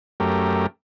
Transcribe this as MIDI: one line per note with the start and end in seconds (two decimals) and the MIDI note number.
0.20 0.67 42
0.20 0.67 57
0.20 0.67 67
0.20 0.67 70